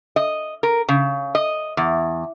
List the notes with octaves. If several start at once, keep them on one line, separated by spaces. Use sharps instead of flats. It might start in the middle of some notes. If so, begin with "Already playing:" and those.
D#5
A#4
C#3
D#5
E2